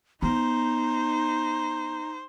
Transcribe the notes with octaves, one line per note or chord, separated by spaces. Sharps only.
B3 D#4 C5 A#5